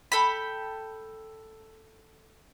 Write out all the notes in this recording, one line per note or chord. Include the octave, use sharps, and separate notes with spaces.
A4 G5 B5